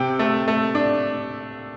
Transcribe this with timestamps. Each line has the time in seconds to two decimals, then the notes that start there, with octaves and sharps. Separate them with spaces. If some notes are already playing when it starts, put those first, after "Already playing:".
Already playing: C3 G5
0.19 A3
0.48 A3
0.75 D4